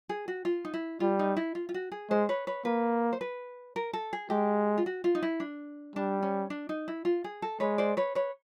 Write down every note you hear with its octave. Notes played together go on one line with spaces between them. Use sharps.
G#4
F#4
F4
D#4
E4
G3 F4
D#4
E4
F4
F4
F#4
G#4
G#3 C5
B4 C#5
B4 C#5
A#3 B4
C5
B4
A#4
A4
G#4
G#3 G4
F4
F#4
F4
D#4
E4
D4
G3 D4
C#4
D4
D#4
E4
F4
G#4
A4
G#3 B4 C#5
C5 D5
B4 C#5
B4 C#5